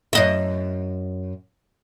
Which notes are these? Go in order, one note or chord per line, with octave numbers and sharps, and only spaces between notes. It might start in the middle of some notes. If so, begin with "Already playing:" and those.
F#2 D#5 E5